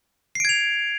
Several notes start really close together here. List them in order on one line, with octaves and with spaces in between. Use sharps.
C7 D7 G#6 F7